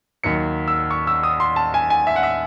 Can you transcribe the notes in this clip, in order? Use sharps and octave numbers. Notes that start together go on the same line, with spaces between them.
D#2 D#3 F#3 C#7
E6
C#6
E6
D#6
C6
A5
G#5
G#5
E5
F#5
E5